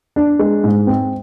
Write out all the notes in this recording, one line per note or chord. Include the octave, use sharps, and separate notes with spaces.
D4
G#3
G#2
C4